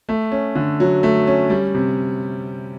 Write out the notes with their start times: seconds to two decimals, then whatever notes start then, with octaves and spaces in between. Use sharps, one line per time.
0.09 A3
0.32 C#4
0.55 D3
0.80 F#3
1.03 A3
1.27 C#4
1.50 G3
1.75 C3